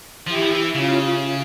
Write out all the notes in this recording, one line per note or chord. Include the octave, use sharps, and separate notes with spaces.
F3 E4 G4
E3
F3
E3
C#3 C#4 F4